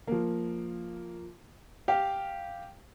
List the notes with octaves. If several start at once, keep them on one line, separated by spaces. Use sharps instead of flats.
F3 A#3
G4 F5